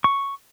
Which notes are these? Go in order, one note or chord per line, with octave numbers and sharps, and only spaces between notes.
C#6